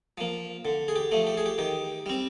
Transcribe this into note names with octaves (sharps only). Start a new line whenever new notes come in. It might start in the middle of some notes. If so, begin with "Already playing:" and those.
F3 A#3
D3
G#4
G4
F3 A3
G4
G#4
G4
D#3 G4
G3 C4